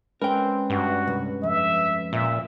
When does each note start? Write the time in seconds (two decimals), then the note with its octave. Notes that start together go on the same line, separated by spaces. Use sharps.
0.22 G#3 C4 C#4 A#4 B4 G5
0.70 G2 F#4
1.07 C2
1.43 F2 E5
2.13 A#2 E5